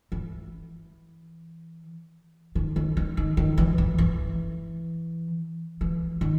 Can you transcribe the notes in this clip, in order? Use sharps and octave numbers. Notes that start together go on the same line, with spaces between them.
E3
D#3
D#3
D#3
D#3
D#3
E3
E3
E3
E3
D#3